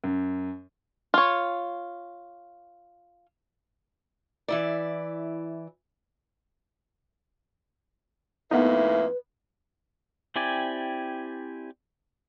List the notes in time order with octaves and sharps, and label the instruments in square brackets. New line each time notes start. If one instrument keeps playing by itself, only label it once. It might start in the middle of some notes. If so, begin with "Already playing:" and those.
[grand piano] F#2
[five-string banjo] F4 C#5
[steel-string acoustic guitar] E3 E4 D5
[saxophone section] F2 A2 A#3 [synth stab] B3 D#4 [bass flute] B4 [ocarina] E5
[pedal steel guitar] C4 E4 G4 D5 G#5